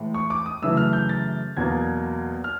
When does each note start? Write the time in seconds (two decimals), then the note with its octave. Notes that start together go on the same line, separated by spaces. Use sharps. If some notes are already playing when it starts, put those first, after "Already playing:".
Already playing: A2 E3 G#3
0.14 C#6
0.30 D6
0.46 D#6
0.62 F#2 C#3 E3 A3 E6
0.77 F6
0.93 G6
1.09 A6
1.57 E2 B2 F#3 A#3 G#6
2.44 F6